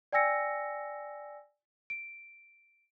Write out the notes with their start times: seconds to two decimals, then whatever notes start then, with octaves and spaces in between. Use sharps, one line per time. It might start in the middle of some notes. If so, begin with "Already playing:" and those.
0.13 D5 G5 G#5 E6 A#6 C#7
1.90 D7